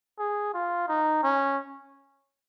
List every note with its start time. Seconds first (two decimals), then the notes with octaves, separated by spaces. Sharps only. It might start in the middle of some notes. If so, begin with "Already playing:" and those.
0.19 G#4
0.54 F4
0.88 D#4
1.23 C#4